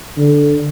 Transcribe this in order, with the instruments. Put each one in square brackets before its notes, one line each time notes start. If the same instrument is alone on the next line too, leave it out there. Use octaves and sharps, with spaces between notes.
[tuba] D3